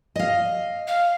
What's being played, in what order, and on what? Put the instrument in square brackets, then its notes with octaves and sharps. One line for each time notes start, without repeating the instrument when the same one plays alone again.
[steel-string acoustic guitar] D#5 F5
[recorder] F5